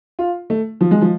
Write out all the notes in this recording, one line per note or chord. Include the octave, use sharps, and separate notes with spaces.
F4
A3
F3
G#3
F3